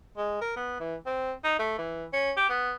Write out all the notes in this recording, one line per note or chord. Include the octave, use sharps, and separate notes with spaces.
G#3
A#4
B3
E3
C4
D#4
A3
E3
C#4
G4
B3